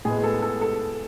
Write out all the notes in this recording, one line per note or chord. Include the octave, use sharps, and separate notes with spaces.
A2 G#3 B3 G#4
A4
A4
A4